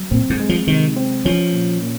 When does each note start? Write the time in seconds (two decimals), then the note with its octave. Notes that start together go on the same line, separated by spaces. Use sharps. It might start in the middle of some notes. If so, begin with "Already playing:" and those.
Already playing: F#3
0.11 A#2 C4
0.30 G#2
0.40 G#3
0.49 F3
0.67 C3 D#3
0.96 C4
1.25 F3 C#4
1.53 A#2
1.82 A#2